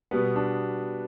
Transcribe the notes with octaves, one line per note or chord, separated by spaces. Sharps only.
B2 G3 B3 B4
D4